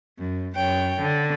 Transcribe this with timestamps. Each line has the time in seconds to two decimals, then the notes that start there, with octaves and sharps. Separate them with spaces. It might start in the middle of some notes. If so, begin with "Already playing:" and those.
0.18 F#2
0.55 F#2 C#5 G5
1.00 D3